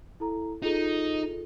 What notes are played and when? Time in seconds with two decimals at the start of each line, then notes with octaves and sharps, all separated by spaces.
0.20 E4 A4 A#5
0.63 D#4 F4 G#4 A4